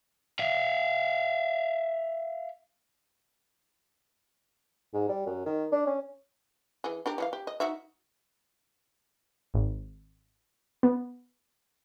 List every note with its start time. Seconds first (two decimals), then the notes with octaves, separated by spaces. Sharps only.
0.39 E5 F5
4.94 G#2
5.09 G3
5.26 F#2
5.46 D#3
5.72 D4
5.87 C#4
6.84 E3 G#4
7.06 D4 G4 A#4
7.18 E3 D#4 F5
7.33 G4
7.47 D#5
7.60 D#4 F#4 E5
9.54 G#1
10.83 B3